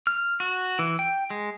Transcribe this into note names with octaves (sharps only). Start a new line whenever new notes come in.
F6
F#4
E3
G5
G#3